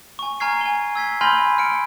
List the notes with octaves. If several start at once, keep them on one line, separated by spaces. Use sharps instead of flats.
G#5 C#6
G#5 A#5 C#6 F6 G#6 C7
G#5 G7
E6 G#6 B6 C7
G#5 B5 C6 F6 G6 A#6
F6 C#7 D7